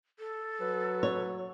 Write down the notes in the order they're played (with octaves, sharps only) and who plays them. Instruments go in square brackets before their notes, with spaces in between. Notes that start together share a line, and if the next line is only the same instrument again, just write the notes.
[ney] A4
[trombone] F#3 [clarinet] B4
[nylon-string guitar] C#5